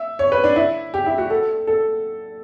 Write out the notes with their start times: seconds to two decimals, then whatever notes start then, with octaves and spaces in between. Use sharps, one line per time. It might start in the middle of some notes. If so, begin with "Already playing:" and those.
Already playing: E5
0.19 C#5
0.32 B4
0.44 D4
0.56 E4
0.94 G4
1.06 E4
1.18 F#4
1.30 A4
1.67 A4